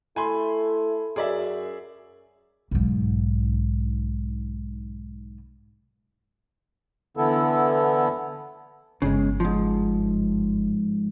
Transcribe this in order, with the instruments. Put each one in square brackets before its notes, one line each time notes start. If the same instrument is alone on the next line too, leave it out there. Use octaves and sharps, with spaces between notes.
[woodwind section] A3 E4 [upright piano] G#5 B5 C6
[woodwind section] F#2 [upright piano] G#4 D5 E5
[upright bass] B1 G#2
[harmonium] D3 E3 B3 E4 A4
[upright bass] G1 [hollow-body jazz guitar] C#3 G#3
[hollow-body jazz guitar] G#2 F3